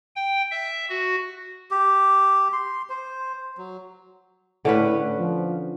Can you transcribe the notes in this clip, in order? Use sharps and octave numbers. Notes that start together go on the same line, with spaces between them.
G5
E5
F#4
G4
C6
C5
F#3
A2 D3 C#4 B4
F3